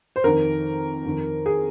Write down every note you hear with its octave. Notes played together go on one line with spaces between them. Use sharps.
C5
F2 D#3 A#4
F2 D#3
G#4